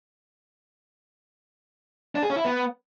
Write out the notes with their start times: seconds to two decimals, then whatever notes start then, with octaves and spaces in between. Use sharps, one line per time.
2.15 D4
2.23 G#4
2.30 C#4
2.37 E4
2.45 B3